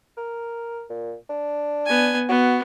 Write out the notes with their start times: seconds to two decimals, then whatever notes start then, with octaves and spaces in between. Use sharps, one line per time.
0.17 A#4
0.90 A#2
1.29 D4
1.86 B3 G#5
2.29 B3 F#4